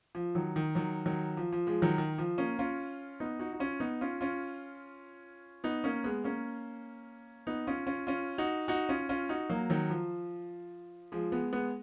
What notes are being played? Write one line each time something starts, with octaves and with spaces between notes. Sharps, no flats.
F3
D#3 F#3
D#3
D#3 F#3
D#3 F#3
F3
F3
F3 G#3
D#3 F#3
D#3
F3
A#3 C#4
C#4 F4
B3 D#4
D#4 F#4
D#4
C#4 F4
B3 D#4
C#4 F4
C#4 F4
B3 D#4
A#3 C#4
G#3 B3
A#3 C#4
B3 D#4
C#4 F4
C#4 F4
C#4 F4
D#4 F#4
D#4 F#4
C#4 F4
C#4 F4
D#4 F#4
F#3 A#3
D#3 F#3
F3
F3 G#3
G#3 B3
G#3 B3